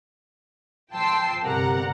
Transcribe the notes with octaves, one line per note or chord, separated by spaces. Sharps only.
F3 G5 A5 C6 E6 C7
G1 C3 G3 A#4 F#5 A#5